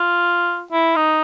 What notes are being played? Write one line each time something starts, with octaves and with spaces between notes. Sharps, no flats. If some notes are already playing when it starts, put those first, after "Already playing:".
Already playing: F4
E4
D#4